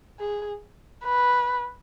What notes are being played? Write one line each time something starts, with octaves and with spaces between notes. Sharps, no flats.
G#4
B4